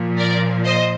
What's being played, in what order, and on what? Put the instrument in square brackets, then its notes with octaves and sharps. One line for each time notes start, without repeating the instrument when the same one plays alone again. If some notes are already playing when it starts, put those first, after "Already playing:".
Already playing: [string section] A#2 F3
A#4 D5
C5 D#5